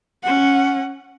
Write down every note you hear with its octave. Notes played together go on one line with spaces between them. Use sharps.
C#4 F#5